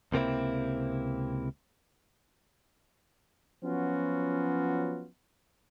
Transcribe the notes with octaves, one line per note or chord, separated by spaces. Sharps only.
C#2 C3 A#3 C4 E4
F3 F#3 B3 C#4 F4 F#4